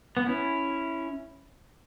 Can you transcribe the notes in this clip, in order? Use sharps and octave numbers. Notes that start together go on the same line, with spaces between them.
B3
C#4 E4